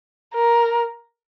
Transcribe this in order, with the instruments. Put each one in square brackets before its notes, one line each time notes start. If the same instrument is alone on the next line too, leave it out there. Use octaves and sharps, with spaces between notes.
[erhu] A#4